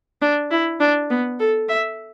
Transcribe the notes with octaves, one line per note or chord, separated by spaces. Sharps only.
D4
E4
D4
B3
A4
E5